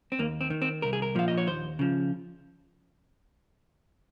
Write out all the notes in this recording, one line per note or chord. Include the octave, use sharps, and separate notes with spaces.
C4
D#2 A#3
C4
D#3
C4
C2 A#4
G#4
A#4
A#2 F3 F5
D#5
C#5
D#2 C5
C#3 F3